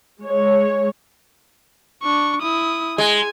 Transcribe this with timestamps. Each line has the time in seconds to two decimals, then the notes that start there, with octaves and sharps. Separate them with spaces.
0.22 G#3 C#5
2.03 D4 C#6
2.42 E4 D#6
2.98 G#3 G#5